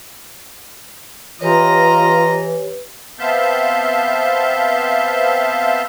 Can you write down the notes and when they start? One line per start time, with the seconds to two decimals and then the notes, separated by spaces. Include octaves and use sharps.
1.41 E3 F4 G4 B4 C#5 D#5 A#5
3.19 B3 C4 E5 F5 A5 G6